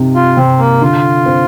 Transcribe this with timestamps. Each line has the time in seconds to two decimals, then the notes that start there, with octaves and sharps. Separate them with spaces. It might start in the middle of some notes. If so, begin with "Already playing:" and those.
Already playing: C3 D#4
0.15 F4
0.37 C3 C4
0.59 A#3
0.81 D3 F4
1.26 C4